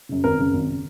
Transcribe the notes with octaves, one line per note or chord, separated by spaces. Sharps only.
F#2 C#3
G#1 A#4
F#2 C#3
G#1
C#3